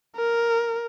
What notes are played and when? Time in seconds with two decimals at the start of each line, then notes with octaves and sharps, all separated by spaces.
0.16 A#4